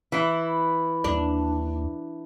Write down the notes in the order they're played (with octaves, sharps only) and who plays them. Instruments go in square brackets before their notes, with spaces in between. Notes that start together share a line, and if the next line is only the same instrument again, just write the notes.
[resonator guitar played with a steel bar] E3 E4
[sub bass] D#2 [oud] D4